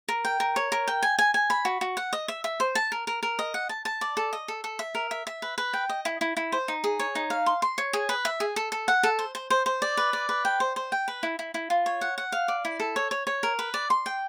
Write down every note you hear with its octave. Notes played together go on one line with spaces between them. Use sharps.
A#4
G5
A#4
C#5
A#4
G5
G#5
G#5
G#5
B5
F#4
F#4
F#5
D#5
E5
E5
C5
A5
A#4
A#4
A#4
D#5
F#5
A5
A5
D5
A4
D#5
A4
A4
E5
A#4
E5
E5
B4
B4
G5
D#5
E4
E4
E4
C5
D#4
G#4
C#5
D#4
F5
C6
C6
C#5
G#4
B4
E5
G#4
A4
A4
F#5
A4
C5
C5
C5
C5
D5
B4
D5
B4
G5
C5
C5
G5
B4
E4
E4
E4
F4
C#5
F#5
F#5
F5
D5
E4
A4
C#5
C#5
C#5
A#4
B4
D5
C6
G5